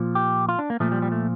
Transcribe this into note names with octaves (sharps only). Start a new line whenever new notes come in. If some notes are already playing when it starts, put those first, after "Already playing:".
Already playing: A#2 F3
G4
F4
D4
A#3
A#2 F3 A3
G3
G3
A3